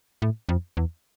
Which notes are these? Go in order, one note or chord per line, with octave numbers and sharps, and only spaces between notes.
A2
F2
E2